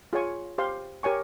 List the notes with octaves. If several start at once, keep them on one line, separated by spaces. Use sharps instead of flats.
F4 G#4 C#5 G#5 C#6
G4 C5 F5 C6
G4 A#4 C#5 G#5 C#6